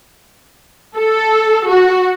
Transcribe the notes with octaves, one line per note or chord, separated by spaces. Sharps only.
A4
F#4